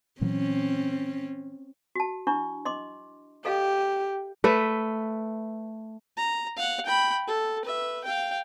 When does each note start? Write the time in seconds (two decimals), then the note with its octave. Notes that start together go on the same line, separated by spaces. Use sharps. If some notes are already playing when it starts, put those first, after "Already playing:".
0.21 A#2 E3 F#3 C4 C#4
1.96 F#4 A5
2.27 D4 E4 C#6
2.65 D#5 C6 D6
3.45 G4 A4 D#5 F5
4.44 A3 B4 E5
6.17 A#5
6.57 F5 F#5
6.86 G5 B5
7.28 A4
7.65 B4 E5
8.04 F5 G5